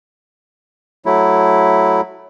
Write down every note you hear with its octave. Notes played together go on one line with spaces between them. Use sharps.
F#3 A3 E4